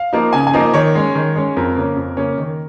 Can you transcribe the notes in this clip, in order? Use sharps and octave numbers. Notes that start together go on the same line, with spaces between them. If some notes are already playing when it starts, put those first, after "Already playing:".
Already playing: F5
F3 A#3 D#4
C#3 G#5
G#5
F3 A#3 D#4
D#5
D#3 C#5
G#3 C#4
D#3
G#3 C#4
F2 A#4
C#3 A#3 C#4
F2
C#3 A#3 C#4
D#3